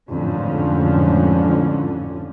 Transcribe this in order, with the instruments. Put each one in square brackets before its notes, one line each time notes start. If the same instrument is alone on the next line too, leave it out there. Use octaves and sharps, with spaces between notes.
[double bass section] A1 F2 G#2 D3 F3 C#4